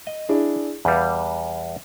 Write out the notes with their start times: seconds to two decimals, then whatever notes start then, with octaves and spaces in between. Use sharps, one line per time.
0.07 D#5
0.29 D4 E4 G#4
0.85 E2 G3 B4 F5